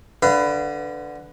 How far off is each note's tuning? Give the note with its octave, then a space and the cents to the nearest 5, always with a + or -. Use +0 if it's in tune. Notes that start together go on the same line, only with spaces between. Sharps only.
D3 +0 B4 +15 F5 -35